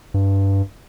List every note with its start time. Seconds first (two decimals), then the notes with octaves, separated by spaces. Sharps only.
0.14 G2